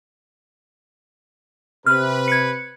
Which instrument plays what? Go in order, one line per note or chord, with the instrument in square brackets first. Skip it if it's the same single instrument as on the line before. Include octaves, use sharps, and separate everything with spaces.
[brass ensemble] C3 B4 [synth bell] F6
[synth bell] G#6 C#7